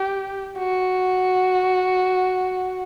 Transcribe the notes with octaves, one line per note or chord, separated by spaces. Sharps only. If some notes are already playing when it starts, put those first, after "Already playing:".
Already playing: G4
F#4